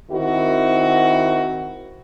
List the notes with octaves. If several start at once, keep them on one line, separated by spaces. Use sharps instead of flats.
D#3 C4 E4 F#4